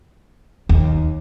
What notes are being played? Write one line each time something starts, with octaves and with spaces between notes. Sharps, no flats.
D#2